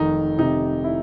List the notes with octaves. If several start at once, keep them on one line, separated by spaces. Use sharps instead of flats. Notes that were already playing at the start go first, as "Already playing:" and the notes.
Already playing: F1 D#3 D#4
C3 D#4
E4